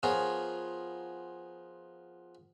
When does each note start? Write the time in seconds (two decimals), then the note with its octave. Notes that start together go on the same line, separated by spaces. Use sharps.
0.03 F3 B3 F4 G#4 A#4 C#5